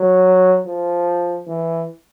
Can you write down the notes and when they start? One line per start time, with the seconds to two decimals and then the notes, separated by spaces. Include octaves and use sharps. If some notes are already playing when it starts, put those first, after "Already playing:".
Already playing: F#3
0.66 F3
1.47 E3